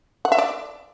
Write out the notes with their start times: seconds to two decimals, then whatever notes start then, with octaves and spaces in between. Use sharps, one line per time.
0.25 F#5
0.32 E5
0.38 D5